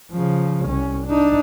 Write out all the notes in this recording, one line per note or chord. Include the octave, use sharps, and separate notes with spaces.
C#3 F3
C2 C#4
D4 D#4